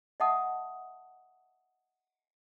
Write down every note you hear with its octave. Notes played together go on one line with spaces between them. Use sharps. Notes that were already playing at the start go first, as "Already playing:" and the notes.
D#5 E5 F#5 A5 D#6